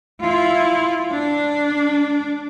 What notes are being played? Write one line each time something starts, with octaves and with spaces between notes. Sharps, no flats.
E4 F4
D4